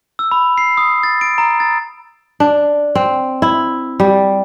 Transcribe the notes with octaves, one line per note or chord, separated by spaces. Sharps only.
E6
B5
C7
D#6
A6
D7
A#5
A6
D4
C4
E4
G3